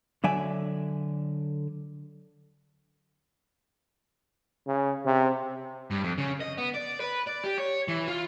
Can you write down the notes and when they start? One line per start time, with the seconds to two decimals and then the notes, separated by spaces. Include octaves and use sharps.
0.24 D3 F#3 D5 E5 G#5
4.67 C#3
5.06 C3
5.90 G2
6.04 F2
6.18 C#3
6.40 D#5
6.58 B3
6.74 D5
7.00 B4
7.27 D5
7.44 G4
7.58 C#5
7.88 E3
8.08 F4